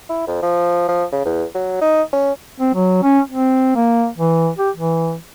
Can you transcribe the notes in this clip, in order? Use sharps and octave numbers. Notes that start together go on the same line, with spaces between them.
E4
F2
F3
F3
C#3
E2
F#3
D#4
C#4
C4
F#3
C#4
C4
A#3
E3
G4
E3